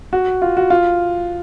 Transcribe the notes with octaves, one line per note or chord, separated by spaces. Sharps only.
F#4
F4
F#4
F4